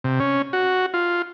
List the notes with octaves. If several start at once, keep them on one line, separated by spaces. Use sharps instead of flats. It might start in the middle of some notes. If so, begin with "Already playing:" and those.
C3
C#4
F#4
F4